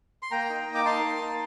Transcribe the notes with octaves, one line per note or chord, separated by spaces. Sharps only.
C6
A#3 G5 A#5
D#4
A#3
D6
D#4 A5 C6
A#3
D#4